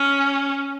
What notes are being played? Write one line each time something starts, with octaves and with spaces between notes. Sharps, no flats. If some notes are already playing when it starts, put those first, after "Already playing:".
Already playing: C#4